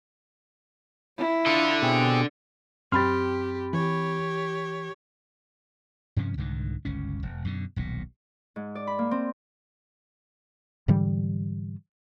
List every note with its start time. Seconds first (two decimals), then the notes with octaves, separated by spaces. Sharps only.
1.17 E4
1.46 D3 F4 A4 D#6
1.82 B2 C4 G4 G#4
2.92 F#2 C4 G4 B5 C6 F6 A6
3.73 E3 G4 C#5
6.17 G2 C3 F3 C#4
6.37 C2 G#2 D3 D#3
6.85 G1 C#2 C#4
7.23 E1
7.45 F#2 B2 D3
7.76 D#1 B1 A#2
8.56 G#2
8.75 D5
8.87 B5
8.99 A#3
9.11 C4
10.88 G#2 D3 E3 G3